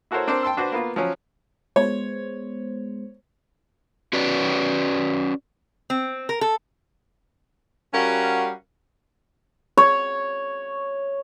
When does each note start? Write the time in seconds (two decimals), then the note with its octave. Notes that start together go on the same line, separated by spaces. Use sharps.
0.11 E4 F#4 A4 A#4 C5 C#5
0.27 C4 D4 A#4 C5 D5 A5
0.43 G5 A5 C6 E6
0.57 D4 F#4 B4 C5
0.72 A#3 B3 F4
0.96 F3 F#3 C#4
1.76 G#3 B3 C5 C#5
4.13 C#4 F#4 B4 D5
5.90 C4
6.29 A#4
6.41 A4
7.93 G3 C#4 F#4 A#4 F5 F#5
9.77 C#5